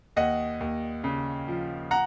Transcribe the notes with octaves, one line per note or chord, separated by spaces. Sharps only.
D#2 D#5 F#5
D#2
C#3
F3
F#5 A#5